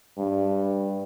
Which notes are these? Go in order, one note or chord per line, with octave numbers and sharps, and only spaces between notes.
G2